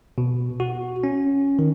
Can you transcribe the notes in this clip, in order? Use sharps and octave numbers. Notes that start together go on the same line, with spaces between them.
B2
F#4
C#4
D#3